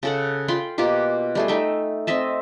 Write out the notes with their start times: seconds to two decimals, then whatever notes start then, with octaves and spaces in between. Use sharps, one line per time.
0.03 C#3 A4 F#5
0.48 F4 G5 B5 C6
0.78 B2 A#3 F4 G4
1.35 G3 A3 G#4
1.48 A3 D#4 E5 G5
2.07 C4 D#5 E5 A5